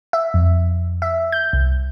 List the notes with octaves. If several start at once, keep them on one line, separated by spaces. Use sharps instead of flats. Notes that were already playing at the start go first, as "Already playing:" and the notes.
E5
F2
E5
G6
C2